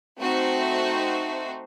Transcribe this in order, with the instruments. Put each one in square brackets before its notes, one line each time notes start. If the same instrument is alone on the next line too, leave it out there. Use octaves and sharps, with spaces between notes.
[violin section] A3 C4 D#4 F#4 C5